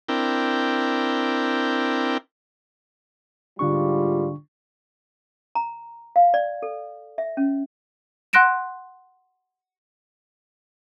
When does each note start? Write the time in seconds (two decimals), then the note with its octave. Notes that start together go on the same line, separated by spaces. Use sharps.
0.09 C4 D4 E4 A#4 G5
3.59 G#2 D3 G3 D4 F4 C#6
5.55 A#5
6.16 F5
6.34 D5
6.62 A4
7.18 E5
7.37 C#4
8.33 F#5 C6 F#6 A#6 D7 E7